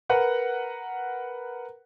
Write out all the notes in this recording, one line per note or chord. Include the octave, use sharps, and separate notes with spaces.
A#4 B4 F#5